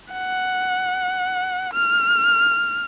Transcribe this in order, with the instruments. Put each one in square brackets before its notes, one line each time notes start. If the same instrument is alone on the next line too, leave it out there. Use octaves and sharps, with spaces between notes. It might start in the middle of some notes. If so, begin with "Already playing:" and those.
[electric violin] F#5
F6